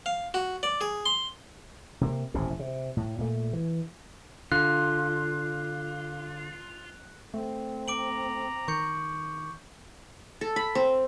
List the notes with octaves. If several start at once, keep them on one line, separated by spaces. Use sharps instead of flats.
F5
F#4
D5
G#4
C6
C3 A#3
D#1 A1 A2 C3
C3
A2
A#2 A3
E3
D3 F4 F#6
A3 C4
A#5 D6 D7 F#7
D#3 C#6 G6 C#7
A4
B5
C4